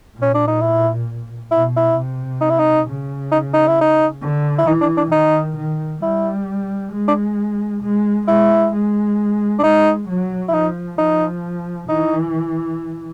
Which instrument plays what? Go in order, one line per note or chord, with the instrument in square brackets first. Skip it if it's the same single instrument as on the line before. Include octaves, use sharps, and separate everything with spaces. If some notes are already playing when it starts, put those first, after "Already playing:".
[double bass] A#2
[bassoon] C#4
D4
D#4
E4
[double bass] B2 [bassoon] E4
[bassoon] E4
[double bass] C3
[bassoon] D#4
E4
D#4
[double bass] C#3
[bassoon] D#4
D#4
E4
D#4
[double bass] D3
[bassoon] E4
[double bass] E3 [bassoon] D#4
[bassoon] D4
D4
[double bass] D#3 [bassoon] D#4
[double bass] D#3
[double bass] G3 [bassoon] E4
[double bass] G#3
[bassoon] D4
[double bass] G#3
[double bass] G#3 [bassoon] E4
[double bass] G#3
[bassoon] D4
[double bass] G#3 [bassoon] D#4
[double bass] F#3
[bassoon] E4
[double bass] F3 [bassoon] D#4
[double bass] F3 [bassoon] D#4
[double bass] E3 [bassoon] D#4